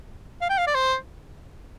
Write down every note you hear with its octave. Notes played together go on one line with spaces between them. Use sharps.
F5
G5
F5
D5
C5